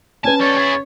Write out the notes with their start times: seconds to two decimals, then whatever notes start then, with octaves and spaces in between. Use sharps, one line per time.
0.24 C#4 B4 G#5 A5
0.41 G3 A4 C#5 A6
0.59 E4 G#4